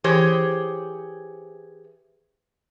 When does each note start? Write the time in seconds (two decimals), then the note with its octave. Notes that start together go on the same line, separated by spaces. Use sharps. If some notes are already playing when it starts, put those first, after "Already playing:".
0.04 E3 G4 G#4 C5 C#5